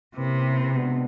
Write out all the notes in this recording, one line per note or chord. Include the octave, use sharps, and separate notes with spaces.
C3 A#3 C#4 E4 G4 B4
B2 G#3 B3 D4